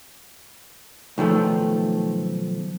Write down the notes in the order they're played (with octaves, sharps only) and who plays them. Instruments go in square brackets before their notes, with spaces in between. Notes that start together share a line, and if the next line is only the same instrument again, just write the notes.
[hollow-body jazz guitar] B1 D#3 F3 A3